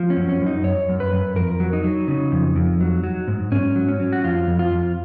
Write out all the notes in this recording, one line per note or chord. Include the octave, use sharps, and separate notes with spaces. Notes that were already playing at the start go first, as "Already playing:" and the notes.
Already playing: F3
C#4
F#2
C#4
F#2
D#4
F#2 C#5
F#2
B4
F#2
F2 A#4
F#3
D#4
F#3
C#3
F2
F2
F#3
F#3
G#2
G#2 C#4
F#3
C#4
F#3
F#4
F2 F4
F2
F4
F2